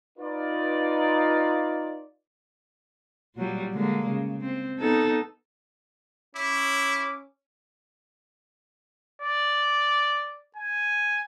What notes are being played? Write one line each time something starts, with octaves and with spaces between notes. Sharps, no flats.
D#4 F4 B4 D5
A#2 F#3 G3
D3 G#3 A#3
C#3
C4
B3 D#4 A4
C#4 E4 D6
D5
G#5